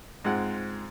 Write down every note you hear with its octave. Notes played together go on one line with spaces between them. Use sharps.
G#2 G#3 C4 F4 F#5